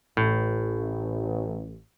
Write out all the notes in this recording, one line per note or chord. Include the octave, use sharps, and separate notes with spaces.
A1 A2